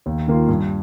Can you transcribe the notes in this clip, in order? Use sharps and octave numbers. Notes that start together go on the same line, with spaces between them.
D#2
D#3 A#3 F4
G2